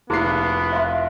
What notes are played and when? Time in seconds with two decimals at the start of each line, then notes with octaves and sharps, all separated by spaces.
0.10 F1 A#3 B3 E4 F#4 G#4 C7
0.73 E5 F5 C6